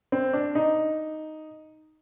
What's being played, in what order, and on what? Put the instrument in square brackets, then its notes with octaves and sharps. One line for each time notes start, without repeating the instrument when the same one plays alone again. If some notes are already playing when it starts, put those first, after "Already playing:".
[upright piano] C4
D4
D#4